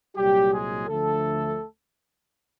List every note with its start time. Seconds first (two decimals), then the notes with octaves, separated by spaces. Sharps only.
0.16 C2 A#2 F#3 G3 G4
0.52 G#3 G#4
0.88 D2 D3 F3 A3 A4